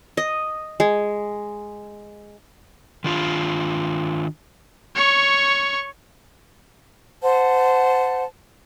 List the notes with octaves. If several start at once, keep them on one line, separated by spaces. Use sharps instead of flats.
D#5
G#3
D#3 D4 F4
C#5 C#6
C5 F#5 A5